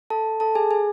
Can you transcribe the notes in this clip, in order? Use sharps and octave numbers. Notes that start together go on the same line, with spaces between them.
A4 A5
A4 A5
G#4 G#5
G#4 G#5